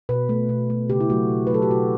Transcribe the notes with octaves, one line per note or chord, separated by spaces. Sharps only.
B2 B4
A3
B2
A3
C#3 G4
E4
F#3 A3 F#4
B2
B4
F#3 A3 A4
G4
B2 F#4